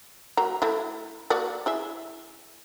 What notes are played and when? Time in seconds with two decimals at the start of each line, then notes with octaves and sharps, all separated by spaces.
0.37 F#3 A#3 A#5
0.62 A3 E4
1.30 A#3 F#4 D5
1.66 E4 G#4 E5